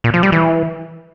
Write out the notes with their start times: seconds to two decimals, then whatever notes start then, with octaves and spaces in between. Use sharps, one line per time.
0.04 A#2
0.14 F3
0.23 G3
0.32 E3